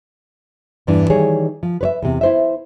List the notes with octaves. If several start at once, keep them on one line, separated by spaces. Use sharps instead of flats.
E2 G2 E3 D4
D#3 E3 G3 G#4 C#5
F3
B4 C#5 E5
E2 C3
E4 C5 E5